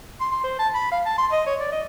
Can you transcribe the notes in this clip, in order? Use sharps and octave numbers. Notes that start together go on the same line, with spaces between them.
C6
C6
C5
A5
B5
F5
A5
C6
D#5
C#5
D5
D#5